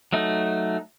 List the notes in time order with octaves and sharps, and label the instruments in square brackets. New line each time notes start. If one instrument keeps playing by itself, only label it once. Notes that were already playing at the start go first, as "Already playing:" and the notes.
[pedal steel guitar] F#3 A3 D#4